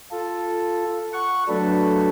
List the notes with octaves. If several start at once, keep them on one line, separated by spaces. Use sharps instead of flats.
F4 A4
F#5 C#6
F#3 A3 D4 A4 B4